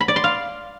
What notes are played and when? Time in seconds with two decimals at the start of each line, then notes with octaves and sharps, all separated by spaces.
0.01 B5
0.08 D5
0.16 C6
0.24 F5